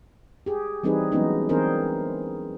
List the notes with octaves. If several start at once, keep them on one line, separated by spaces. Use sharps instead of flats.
G4 G#4
E3 G3 C4 D#4 G#4 B4
E3 F#3 G#3 B3 C#4 D#4
E3 C4 D4 G#4 A#4 C5